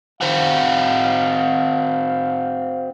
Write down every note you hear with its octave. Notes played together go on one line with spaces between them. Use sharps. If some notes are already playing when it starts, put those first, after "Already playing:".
C4 F#4 F5